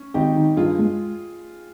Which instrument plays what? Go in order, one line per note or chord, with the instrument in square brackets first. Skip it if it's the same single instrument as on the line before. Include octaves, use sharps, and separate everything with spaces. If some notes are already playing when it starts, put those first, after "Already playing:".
Already playing: [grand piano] C#4
[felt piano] G#1 [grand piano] D#4 G4
[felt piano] D#3
[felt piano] G2 [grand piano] F4 G#4
[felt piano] G#3